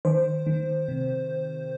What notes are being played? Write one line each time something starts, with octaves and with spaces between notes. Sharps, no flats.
D#3 C5
D#3
C3